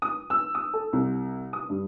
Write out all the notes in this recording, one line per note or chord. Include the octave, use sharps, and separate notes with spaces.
D#6
E6
D#6
A4
C2
D#6
G2